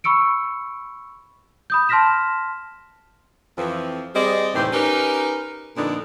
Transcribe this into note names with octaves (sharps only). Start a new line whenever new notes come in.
B5 C#6 E6 C#7 D7
B5 D#6 G6
A5 C6 F6 A#6 B6 E7
F2 E3 F3
G3 C4 G#4 D5 D#5
D#2 A2 C3 E3 G4 C5
C#4 D#4 G4 A#4 B4
F2 A#2 D3 B3 D4 D#4